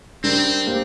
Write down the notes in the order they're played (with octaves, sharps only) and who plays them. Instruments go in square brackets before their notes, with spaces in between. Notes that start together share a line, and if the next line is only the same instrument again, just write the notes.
[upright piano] G3 D4 A#4 [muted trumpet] C4
[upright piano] A#3 G4 C5